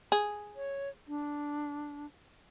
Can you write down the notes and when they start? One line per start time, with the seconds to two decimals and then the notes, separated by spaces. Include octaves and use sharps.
0.12 G#4
0.56 C#5
1.08 D4